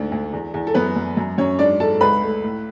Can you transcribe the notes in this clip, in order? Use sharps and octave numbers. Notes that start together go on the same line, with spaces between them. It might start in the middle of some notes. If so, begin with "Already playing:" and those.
Already playing: D2 G#2 D4
D2
E2
E2
A4
F#2 B3 B4
F#2
F#2
F#2 C#4 C#5
G#2 D4 D5
G#2 A4 A5
C#2 B4 B5
A3
A2